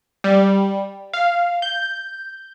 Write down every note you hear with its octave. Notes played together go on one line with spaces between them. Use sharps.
G3
F5
G6